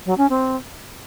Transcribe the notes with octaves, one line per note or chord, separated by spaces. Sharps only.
F#3
C#4
C4